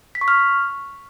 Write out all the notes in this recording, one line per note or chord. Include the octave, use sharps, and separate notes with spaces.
B6
C#6
F6